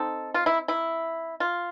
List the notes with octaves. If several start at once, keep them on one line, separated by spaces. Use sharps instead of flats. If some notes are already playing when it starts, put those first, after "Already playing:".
Already playing: C4 D#4 A4
F4
E4
E4
F4